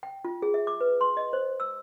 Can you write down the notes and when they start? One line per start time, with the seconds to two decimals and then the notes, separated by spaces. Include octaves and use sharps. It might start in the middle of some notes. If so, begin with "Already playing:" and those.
0.03 G5
0.25 F4
0.42 G#4
0.54 E5
0.67 D6
0.81 B4
1.01 C6
1.17 D#5
1.33 C5
1.60 E6